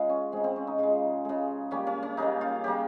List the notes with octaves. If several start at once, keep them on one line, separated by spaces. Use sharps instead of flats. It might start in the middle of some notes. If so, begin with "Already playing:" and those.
Already playing: C#3 G#3 F4
C#4
C#3 G#3 C4
C4
C#4
D#4
C#3 G#3 F4
C#3 G#3
C#3 G3 A#3 C#4
C#4
C#4
C#3 G3 A#3 D#4
F4
C#3 G3 A#3 G4